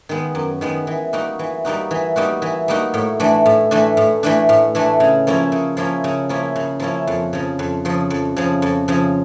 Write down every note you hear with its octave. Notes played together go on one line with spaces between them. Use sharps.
D#3 G#3 B3
F#2
D#3 G#3 B3
E3
G3 A#3 D#4 F#4
E3
G3 A#3 D#4 F#4
E3
G3 A#3 D#4 F#4
E3
G3 A#3 D#4 F#4
A2
E3 A3 D4
A2
E3 A3 D4
A2
E3 A3 D4
A2
E3 A3 D4
C#3
F3 A#3 C#4 E4
C#3
F3 A#3 C#4 E4
C#3
F3 A#3 C#4 E4
C#3
F3 A#3 C#4 E4
F2
C#3 F3
F2
C#3 F3
F2
C#3 F3
F2
C#3 F3